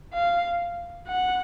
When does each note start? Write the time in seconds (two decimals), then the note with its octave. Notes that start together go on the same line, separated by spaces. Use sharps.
0.14 F5
1.08 F#5